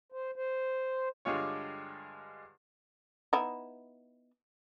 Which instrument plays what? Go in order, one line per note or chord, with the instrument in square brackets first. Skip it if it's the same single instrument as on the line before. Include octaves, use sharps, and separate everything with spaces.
[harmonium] C5
C5
[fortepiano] G2 D3 G#3 F4 C#5
[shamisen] B3 D#4 E4